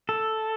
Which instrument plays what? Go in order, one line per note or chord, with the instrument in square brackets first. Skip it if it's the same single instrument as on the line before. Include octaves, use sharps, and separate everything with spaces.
[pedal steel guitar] A4